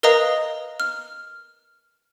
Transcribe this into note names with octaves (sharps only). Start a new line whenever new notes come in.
A#4 B4 D#5 F5 A#5 D#6
F6